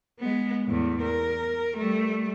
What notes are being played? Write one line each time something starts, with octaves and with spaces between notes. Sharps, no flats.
G#3 B3
E2 A2
A#4
G3 A3